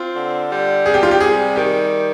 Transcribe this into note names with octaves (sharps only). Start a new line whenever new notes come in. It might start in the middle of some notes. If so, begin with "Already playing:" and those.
Already playing: C4 F4
D3
G3
C3 G#4
G4
F4
G4
G3 G#4
D#3 G4